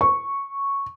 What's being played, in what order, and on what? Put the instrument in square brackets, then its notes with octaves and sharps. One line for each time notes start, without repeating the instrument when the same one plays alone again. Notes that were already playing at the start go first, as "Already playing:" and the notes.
[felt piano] C#6